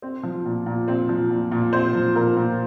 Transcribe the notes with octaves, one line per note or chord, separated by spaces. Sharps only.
C4
F3
A#2
A#2
C4
F3
A#2
A#2
C4 C5
F3
A#2 A#4
A#2